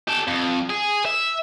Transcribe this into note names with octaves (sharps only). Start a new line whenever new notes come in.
G4 A4
F2
G#4
E5